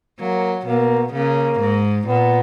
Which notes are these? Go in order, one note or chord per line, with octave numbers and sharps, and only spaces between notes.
F#3 A#3
B2 A#3
C#3 A#3
G#2
A#2 B3